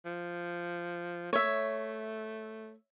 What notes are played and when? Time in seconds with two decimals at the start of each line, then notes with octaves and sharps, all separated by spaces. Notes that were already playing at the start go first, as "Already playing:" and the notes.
0.06 F3
1.33 A3 C#5 E5